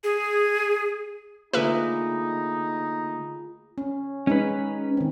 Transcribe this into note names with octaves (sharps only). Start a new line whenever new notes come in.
G#4
D3 A3 A#3 D#4 F4 G#4 B4 E5
C#4
G#3 C#4 D#4 B4
D#3 C4